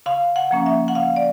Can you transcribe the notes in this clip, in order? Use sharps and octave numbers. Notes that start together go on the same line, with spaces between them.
C#3 F5
F#5
F3 A#3 C#4
E5
F#5
C#3 F5
D5